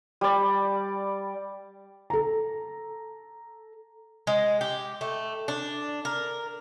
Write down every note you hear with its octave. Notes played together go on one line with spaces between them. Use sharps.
G3 D5
A4 A#5
G#3
G4
A3
D4
A#4